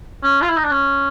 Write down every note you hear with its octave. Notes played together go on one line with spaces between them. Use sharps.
C#4
F4
E4
D#4
D4
C#4